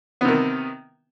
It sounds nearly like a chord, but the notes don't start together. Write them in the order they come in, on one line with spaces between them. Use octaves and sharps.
B3 C3 D#3